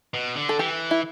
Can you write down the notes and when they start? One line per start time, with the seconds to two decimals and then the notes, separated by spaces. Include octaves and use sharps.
0.14 B2
0.36 D3
0.49 A4
0.59 E3 G4
0.91 E4